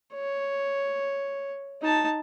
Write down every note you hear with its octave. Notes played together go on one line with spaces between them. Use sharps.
C#5
D#4 A5